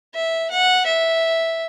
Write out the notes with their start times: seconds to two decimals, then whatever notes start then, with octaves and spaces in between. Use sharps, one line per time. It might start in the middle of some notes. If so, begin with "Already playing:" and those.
0.14 E5
0.50 F#5
0.86 E5